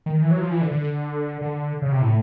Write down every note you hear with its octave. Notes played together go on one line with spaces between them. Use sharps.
D#3
E3
F#3
F3
E3
D3
D3
D3
C#3
C3
A2